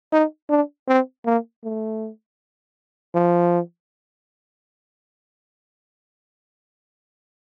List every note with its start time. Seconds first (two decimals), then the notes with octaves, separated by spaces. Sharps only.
0.13 D#4
0.50 D4
0.88 C4
1.25 A#3
1.64 A3
3.14 F3